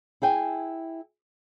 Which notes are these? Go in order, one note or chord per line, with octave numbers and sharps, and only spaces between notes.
E4 G#4 G5 G#5